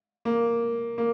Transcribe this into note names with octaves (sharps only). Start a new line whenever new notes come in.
A#3
A#3